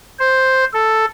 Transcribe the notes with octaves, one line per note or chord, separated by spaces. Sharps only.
C5
A4